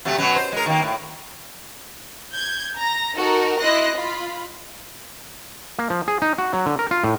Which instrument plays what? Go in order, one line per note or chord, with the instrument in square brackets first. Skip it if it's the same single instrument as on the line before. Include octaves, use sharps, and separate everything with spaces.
[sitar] C3 F#3 A3
B2 F#3 C#4
C5
G#3 A#4
D#3 A#3
A2
[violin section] G6 G#6
A#5 A#6
D#4 F#4 A4 A#4
E4 D#5 C6 F#6 A#6
F4 B5
[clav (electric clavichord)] A#3
F3
G#4
D#4
F#4
F#3
D3
A#4
F4
A2